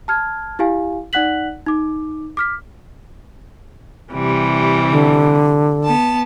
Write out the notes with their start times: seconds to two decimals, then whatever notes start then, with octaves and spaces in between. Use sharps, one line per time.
0.08 A5 F6 G#6
0.59 E4 G4 F5 G#5
1.13 D#4 D5 F#5 F#6 B6 F#7
1.66 D#4 D6
2.37 D6 F6 B6
4.13 C3 E3 G3
4.91 D3
5.84 B3 A5